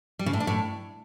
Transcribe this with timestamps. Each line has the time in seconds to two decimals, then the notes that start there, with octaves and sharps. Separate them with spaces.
0.19 G3
0.26 C#3
0.33 A2
0.40 D4
0.47 A2